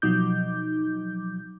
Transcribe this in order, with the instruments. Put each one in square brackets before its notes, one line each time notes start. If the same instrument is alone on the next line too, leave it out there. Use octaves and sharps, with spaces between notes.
[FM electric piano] B2 F3 F#3 D#4 D6 G6